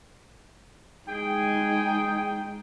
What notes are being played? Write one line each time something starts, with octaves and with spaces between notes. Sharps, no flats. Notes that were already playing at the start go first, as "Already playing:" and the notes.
G#3 D#4 G#4 G5